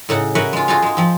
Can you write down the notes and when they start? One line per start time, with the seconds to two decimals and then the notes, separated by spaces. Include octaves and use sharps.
0.09 A2 C#3 D#4 F#5
0.35 F#4 A#4 B4 C#5 E5 F#5
0.53 G#3 F4
0.68 F4 F#4 G#4 A4 C5 F5
0.82 G#3 D#4
0.97 F3 C4